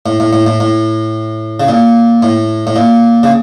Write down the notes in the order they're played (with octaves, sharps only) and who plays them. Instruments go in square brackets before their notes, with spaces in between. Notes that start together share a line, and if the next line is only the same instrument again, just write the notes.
[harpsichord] A2
A2
A2
A2
A2
C#3
A#2
A2
A2
A#2
C#3